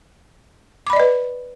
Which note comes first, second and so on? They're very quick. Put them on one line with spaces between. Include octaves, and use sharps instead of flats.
D6 B5 D5 D#5 B4